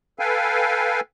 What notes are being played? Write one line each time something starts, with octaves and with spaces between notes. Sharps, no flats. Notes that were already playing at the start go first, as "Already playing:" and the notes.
A4 B4 F5 G5 G#5